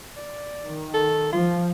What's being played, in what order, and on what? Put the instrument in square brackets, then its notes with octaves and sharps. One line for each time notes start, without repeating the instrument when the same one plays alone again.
[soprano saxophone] D5
[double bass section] D#3
[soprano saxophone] A4
[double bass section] F3 [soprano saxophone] F4